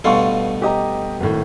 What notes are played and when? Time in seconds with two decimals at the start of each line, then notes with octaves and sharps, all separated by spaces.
0.04 G2 B2 A3 F5 C6 C#6
0.62 G4 D#5 A#5
1.20 G#1 A2